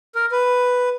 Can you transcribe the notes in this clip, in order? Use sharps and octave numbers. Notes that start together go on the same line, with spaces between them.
A#4
B4